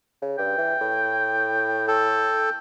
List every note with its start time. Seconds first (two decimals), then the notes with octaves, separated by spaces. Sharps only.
0.21 C#3
0.38 G2 G5
0.58 E3
0.81 A2
1.88 A4 G5